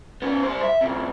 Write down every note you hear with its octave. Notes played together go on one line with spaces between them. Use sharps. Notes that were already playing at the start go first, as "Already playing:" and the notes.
B3 C#4
G3 C5
E5
D2 C3